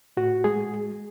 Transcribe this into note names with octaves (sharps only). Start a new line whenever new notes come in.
A2 F#4
G#3 G#4